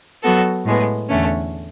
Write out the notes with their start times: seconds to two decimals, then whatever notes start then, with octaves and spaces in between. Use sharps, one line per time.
0.22 F#3 B3 F#4 A4
0.65 A2 G#3 B3
1.09 E2 D3 A3 C#4